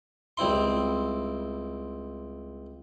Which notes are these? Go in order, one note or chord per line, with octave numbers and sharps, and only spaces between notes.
C#2 G3 C4 E4 C6